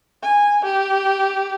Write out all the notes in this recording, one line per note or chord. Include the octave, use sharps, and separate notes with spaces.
G#5
G4